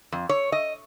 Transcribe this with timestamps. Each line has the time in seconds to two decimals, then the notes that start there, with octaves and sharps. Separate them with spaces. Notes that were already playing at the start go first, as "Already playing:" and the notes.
0.12 F2
0.29 C#5
0.52 D#5